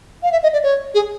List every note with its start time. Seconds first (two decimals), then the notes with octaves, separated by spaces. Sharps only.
0.23 F5
0.32 E5
0.43 D#5
0.53 D5
0.63 C#5
0.94 G#4